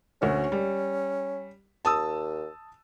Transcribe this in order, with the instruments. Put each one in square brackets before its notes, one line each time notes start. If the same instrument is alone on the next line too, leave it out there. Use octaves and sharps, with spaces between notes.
[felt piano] D2 F#4 [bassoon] C#4
[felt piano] G3
[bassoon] D#2 [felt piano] A5 D#6 E6